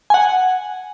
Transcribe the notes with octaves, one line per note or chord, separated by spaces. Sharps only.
F#5 G#5